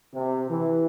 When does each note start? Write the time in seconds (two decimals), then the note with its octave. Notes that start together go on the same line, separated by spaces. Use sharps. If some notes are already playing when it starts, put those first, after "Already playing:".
0.13 C3
0.50 E3